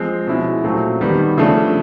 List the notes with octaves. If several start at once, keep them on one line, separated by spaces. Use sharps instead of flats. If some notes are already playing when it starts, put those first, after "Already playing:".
Already playing: F3 G#3 C4
B2 G#3 C#4 E4
A#2 F#3 A3 C4
D#3 G3 B3
C#3 F3 A3 D4